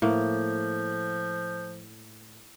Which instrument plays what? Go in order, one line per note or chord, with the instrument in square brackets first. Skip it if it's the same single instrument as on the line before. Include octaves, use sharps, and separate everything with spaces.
[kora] A2 A#3 [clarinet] F3